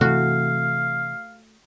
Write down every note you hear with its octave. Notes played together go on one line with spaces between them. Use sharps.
C3 E3 A3 F#4 F5